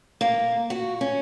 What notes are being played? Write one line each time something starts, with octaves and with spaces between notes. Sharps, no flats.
A#3
F#4
C#4